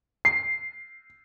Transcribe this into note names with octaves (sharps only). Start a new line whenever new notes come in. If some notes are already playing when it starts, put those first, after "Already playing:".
C7